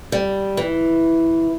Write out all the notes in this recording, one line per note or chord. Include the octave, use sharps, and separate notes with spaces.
G3
E3